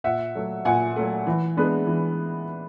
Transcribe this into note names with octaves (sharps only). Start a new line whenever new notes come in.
A#2 E5 F#5
F#3 A3
A#2 F#5 G#5
F#3 A3
E3
G#3 B3 D4
E3